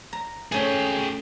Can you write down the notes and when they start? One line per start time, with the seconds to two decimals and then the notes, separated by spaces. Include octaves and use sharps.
0.13 A#5
0.52 A3 C#4 G#4 G5